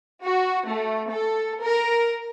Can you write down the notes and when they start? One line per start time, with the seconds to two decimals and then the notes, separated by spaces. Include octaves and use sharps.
0.22 F#4
0.67 A3
1.08 A4
1.60 A#4